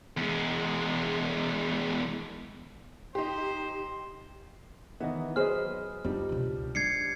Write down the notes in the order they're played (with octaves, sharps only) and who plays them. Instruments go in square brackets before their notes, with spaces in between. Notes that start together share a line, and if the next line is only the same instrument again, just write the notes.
[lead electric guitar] E2 G#3
[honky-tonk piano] D#4 G4 [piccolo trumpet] C5
[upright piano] D#3 E3 B3 [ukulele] E4 D#5
[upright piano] F#3 B4 D#5 [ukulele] G#4 C5 [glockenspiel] F6
[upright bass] F2 D4 [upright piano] F3 G3 D#4
[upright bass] C#2 B2
[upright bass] G#3 [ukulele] D4 [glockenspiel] G#6 C7 C#7